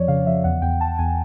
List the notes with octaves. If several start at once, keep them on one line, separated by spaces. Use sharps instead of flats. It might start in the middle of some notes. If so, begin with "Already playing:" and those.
Already playing: F2 F3 C#5 D5
C#3 F5
F3 E5
E2 F#5
E2 G5
E2 A5
E2 G#5